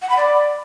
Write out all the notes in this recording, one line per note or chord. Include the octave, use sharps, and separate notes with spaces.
F#5
B5
D5